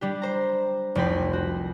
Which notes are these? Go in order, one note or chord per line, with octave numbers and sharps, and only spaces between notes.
G3 D4 G4
C5 A#5
F1 C2 C4 G5 B5 C6
F#4